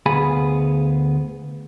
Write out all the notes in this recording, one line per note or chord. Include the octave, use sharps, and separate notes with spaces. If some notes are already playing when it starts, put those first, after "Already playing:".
D2 B3 G#4 F5 G#5 B5